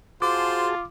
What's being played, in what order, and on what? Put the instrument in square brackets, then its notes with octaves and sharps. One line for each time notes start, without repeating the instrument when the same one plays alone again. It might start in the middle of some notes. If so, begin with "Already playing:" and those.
[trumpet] F4 [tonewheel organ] F#4 G#4 A5 [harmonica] C5 [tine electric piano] D6